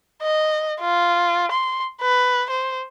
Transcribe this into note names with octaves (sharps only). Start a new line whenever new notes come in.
D#5
F4
C6
B4
C5